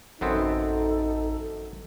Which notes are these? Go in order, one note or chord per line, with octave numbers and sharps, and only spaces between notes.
A1 F#2 B3 C4 D#4 A4